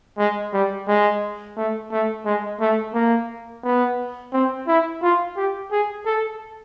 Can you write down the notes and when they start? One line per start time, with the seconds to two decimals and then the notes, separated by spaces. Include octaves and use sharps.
0.18 G#3
0.53 G3
0.88 G#3
1.57 A3
1.91 A3
2.26 G#3
2.60 A3
2.94 A#3
3.64 B3
4.33 C4
4.67 E4
5.02 F4
5.36 G4
5.71 G#4
6.05 A4